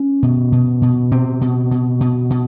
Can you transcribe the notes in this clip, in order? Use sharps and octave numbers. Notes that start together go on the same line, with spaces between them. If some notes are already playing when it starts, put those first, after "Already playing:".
Already playing: C#4
B2
B2
B2
B2 C4
B2
B2
B2
B2